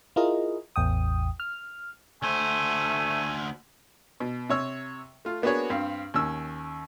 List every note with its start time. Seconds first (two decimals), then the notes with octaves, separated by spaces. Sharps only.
0.16 E4 F4 G#4 A#4 D#5
0.76 A1 E2 G5 D#6
1.40 F6
2.22 D2 A3 C5 G#5
4.20 B2
4.50 C3 C#5 E6
5.25 A3 F4
5.42 A#3 B3 D4 F#4 G#4 C#5
5.70 G2 C4 F5
6.14 D#2 C#4 E6